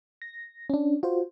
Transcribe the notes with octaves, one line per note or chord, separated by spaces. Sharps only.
A#6
C#4 D4
F4 F#4 C5